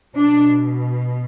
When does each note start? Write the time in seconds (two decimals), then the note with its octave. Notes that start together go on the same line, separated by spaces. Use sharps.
0.16 B2 D4